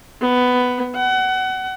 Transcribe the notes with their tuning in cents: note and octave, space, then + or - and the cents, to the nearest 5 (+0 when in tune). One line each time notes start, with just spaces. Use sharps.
B3 +10
F#5 +25